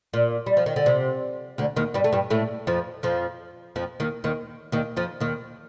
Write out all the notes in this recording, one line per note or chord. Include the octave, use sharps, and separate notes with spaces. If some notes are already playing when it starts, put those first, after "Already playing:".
A#2
G3
F3
D#3
D3
C3
D2 D3
D#2 D#3
G2 G3
A3
G2 G3
A2 A3
F2 F3
F2 F3
F2 F3
D#2 D#3
D#2 D#3
D#2 D#3
F2 F3
D#2 D#3